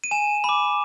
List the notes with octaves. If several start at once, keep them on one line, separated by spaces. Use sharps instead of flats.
D#7
G#5 E7
B5 D6